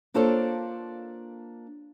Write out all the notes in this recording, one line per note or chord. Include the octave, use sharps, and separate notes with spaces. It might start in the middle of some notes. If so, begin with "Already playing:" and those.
A#3 D4 F4 A4 C5 C#5